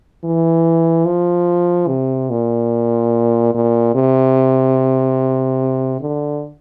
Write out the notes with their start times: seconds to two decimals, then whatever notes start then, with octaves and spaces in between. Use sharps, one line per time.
0.24 E3
1.06 F3
1.88 C3
2.30 A#2
3.54 A#2
3.95 C3
6.01 D3